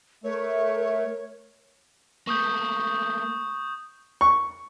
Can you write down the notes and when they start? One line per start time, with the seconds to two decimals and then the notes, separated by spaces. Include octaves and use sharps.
0.24 A3 A#4 C#5
2.27 A3 A#3 C#6 D#6 G6
4.21 C#6